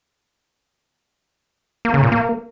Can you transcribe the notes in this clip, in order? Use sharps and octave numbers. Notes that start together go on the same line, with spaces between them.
A#3
C#3
A#2
A#3